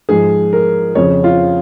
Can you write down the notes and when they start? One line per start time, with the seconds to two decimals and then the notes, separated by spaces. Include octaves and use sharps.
0.09 G#2 F3 G#4
0.53 A#4
0.95 F2 C#3 F3 C#5
1.24 F4